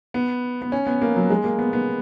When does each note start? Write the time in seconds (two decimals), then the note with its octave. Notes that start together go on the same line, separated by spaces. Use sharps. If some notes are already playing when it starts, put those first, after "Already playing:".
0.14 B3
0.62 B3
0.72 C#4
0.87 B3
1.02 A#3
1.16 F#3
1.30 G#3
1.44 A#3
1.59 B3
1.73 B3